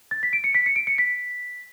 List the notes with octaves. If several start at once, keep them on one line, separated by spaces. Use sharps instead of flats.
A6
B6
D7
C#7
B6
C#7
D7
C#7
B6